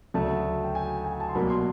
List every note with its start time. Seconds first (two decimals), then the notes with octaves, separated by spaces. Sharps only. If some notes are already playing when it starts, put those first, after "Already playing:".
0.14 D2 C#3 F#3 A3 A5
0.64 G5
0.75 G#5
1.05 G#5
1.20 A5
1.29 C6
1.35 C2 B2 F#3 A#3 B5
1.50 C6